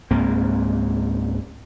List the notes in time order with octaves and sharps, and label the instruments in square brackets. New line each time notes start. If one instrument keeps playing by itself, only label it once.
[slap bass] C#2 G#2 A#3 C4